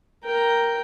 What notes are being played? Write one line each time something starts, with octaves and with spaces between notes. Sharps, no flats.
A#4 G5